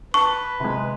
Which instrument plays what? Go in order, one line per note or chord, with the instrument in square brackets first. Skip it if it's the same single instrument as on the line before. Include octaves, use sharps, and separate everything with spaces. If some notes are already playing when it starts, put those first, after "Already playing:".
[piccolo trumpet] B4 [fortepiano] A5 [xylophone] C#6
[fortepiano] C3 G#3